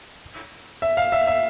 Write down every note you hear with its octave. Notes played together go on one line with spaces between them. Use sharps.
E5
F5
E5
E5